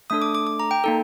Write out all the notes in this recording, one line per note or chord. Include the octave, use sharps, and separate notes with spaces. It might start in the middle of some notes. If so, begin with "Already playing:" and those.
A3 D4 A4 D#6
D6
D6
D6
A#5
G5
A#3 D#4 A4